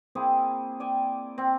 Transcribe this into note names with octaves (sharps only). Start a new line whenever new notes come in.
A#3 C4 E4 G#4
D5 G5 G#5
C4